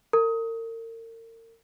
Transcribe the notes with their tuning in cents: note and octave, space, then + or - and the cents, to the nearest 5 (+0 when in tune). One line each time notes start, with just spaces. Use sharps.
A#4 -40